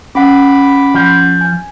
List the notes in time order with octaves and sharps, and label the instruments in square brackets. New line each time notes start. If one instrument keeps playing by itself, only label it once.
[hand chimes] C#4 F#5 [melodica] B5 D6
[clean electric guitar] F3
[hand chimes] G#5